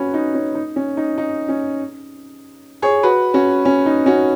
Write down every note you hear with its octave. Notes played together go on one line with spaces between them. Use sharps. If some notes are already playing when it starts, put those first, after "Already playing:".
Already playing: C#4 F#4 B4
D#4
C#4
D#4
C#4
D#4
D#4
C#4
G#4 C#5
F#4 B4
C#4 F#4
C#4
D#4
C#4 F#4